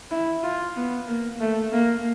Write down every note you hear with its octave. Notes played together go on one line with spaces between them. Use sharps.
E4
F4
B3
A#3
A3
A#3